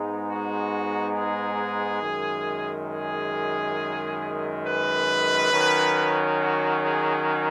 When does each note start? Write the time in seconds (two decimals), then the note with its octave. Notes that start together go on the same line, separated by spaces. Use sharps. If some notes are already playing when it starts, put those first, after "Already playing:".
Already playing: G#2 G#3 B3 D#4
0.28 F#4
1.15 G#4
2.02 F#2 D#3 G#3
2.90 G#4
4.64 B4
5.51 D#3 F#3 C#4
6.38 F#4
6.82 G#4